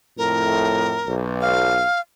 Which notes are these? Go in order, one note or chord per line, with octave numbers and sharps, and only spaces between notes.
F2 A2 A#4
B1
F5